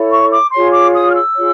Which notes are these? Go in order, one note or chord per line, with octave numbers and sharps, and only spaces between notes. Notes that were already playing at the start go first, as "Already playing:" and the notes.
Already playing: E4 A4 C#5
C#6
D6
F4 G#4 C#5 C6
D6
D#6
F6
E6
F4 G#4 C#5